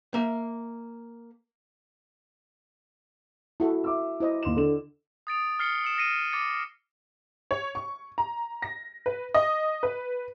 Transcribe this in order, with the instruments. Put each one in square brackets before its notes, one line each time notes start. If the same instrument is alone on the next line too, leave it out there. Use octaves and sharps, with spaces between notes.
[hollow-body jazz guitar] A#3 E5
[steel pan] E4 F#4 A4
[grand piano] E5 D6 E6
[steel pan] E4 C5 D#5
[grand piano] D#2 C6 E7
D3 E7
[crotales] D#6 A6 D7 F7
F6 A6 C7 C#7 G7
E6 C#7 E7
A#6 C7 C#7 D#7
D6 A6 C#7
[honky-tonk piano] C#5
C#6
A#5
A#6
B4
D#5
B4